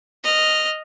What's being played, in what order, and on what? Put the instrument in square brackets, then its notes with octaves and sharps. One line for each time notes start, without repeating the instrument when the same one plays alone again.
[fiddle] D#5 F6